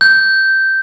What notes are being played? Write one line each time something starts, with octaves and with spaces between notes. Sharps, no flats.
G6